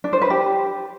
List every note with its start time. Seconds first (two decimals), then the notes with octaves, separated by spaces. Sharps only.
0.04 D4
0.13 C5
0.21 B4
0.30 G4